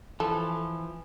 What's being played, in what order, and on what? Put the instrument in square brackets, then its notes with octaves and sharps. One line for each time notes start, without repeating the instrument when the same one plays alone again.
[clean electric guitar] E3 F3 [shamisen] A4